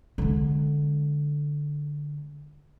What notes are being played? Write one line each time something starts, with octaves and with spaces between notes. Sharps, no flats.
D3 G#3